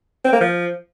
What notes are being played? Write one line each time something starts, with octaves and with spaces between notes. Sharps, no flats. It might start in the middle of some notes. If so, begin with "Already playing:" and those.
C4
A#3
F3